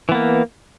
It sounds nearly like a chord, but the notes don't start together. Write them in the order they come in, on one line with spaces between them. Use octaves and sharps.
E3 B3 A#3